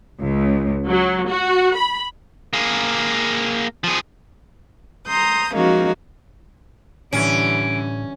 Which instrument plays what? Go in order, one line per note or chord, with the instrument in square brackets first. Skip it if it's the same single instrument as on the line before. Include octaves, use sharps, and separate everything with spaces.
[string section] C#2
F#3
F#4
B5
[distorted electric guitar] A#3 G#4
F3 G#4
[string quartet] A#5 C6 D#6 G6
F3 G#3 A#3 C#4 D#4 F#4
[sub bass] A2 [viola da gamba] D3 E3 G3 [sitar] C#4 [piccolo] D7